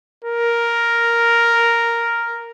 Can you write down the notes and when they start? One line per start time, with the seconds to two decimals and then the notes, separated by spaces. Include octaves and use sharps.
0.24 A#4